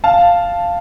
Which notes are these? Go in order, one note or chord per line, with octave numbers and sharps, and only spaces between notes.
F5 A5